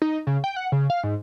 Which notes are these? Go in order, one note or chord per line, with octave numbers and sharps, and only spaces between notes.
D#4
C#3
G5
F#5
C#3
F5
G#2